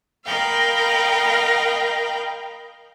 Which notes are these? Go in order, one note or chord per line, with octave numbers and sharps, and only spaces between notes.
A#4 D#5 F5 G5 B5